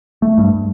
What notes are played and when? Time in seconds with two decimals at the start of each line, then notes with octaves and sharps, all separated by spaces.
0.22 A3
0.38 G2